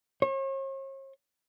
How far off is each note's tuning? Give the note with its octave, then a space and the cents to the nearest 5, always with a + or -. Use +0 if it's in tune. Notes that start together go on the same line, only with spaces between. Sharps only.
C#5 -45